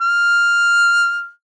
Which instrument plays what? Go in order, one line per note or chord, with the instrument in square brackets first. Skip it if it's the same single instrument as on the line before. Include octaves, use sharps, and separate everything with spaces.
[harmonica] F6